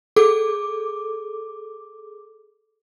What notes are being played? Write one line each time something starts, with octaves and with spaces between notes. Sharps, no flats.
G#4 A4 D6